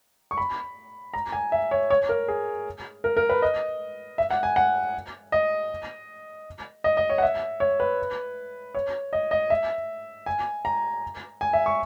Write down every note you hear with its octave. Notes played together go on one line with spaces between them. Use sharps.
C#6
B5
A#5
G#5
E5
C#5
C#5
A#4
G#4
A#4
A#4
B4
D#5
E5
F#5
G#5
F#5
D#5
D#5
D#5
C#5
F#5
E5
C#5
B4
C#5
D#5
D#5
E5
G#5
A#5
G#5
E5
C#6